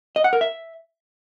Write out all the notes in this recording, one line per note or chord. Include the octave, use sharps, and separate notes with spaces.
D#5
F#5
A#4
E5